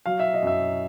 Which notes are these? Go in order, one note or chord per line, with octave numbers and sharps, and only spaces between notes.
F#3 F5
E5
D#5
F#2 E5